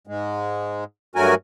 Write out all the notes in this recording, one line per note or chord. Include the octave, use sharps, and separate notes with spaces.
G#2 G#3
G2 F#3 A3 F#4 A#4 G#5